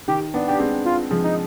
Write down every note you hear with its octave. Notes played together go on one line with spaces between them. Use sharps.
D#3 G4
B3 D4
D4 G4
G#3 C4
F4
F3 G#3
D#4